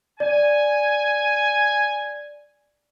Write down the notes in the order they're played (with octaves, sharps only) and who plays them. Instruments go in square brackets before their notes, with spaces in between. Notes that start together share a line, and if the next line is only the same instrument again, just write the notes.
[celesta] D5 [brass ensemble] G#5